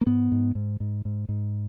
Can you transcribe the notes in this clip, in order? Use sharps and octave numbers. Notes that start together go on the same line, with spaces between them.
A#3
G#2 B3
G#2
G#2
G#2
G#2
G#2